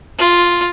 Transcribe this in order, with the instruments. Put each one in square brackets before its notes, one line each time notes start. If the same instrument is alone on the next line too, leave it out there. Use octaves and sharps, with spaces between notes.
[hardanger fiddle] F4